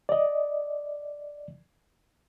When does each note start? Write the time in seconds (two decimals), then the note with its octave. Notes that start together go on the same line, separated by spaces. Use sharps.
0.09 D5 D#5